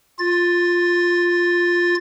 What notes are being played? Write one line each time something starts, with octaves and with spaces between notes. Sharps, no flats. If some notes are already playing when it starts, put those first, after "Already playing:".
F4 A6